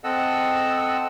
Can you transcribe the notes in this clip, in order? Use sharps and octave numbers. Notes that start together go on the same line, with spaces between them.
C4 A4 D#5 F#5 E6